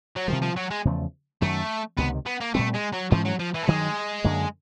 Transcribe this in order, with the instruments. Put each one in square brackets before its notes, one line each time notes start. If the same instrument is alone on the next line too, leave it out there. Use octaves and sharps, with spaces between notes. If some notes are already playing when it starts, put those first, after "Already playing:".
[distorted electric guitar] F#3
[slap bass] C3 D#3 G3 [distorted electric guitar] F3
[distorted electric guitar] F3
F#3
G#3
[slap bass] E2 C#3 F3 A3
[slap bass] F#2 D#3 F#3 [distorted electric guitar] A3
[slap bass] C#2 C3 D#3 [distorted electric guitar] B3
[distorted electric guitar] B3
A#3
[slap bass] A#2 G3 C4 [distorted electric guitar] A3
[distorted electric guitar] G#3
F#3
[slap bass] G#2 E3 G#3 C#4 [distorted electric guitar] F3
[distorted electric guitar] F#3
F3
E3
A3
[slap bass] G2 D#3 F#3 [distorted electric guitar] G#3
[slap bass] F#2 D3 F#3 A#3